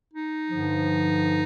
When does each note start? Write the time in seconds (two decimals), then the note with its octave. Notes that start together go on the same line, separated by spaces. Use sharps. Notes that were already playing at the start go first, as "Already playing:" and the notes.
0.14 D#4
0.50 G2 D3 F3